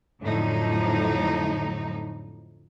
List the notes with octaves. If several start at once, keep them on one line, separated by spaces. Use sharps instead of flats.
F2 A2 D3 F3 F#3 D#4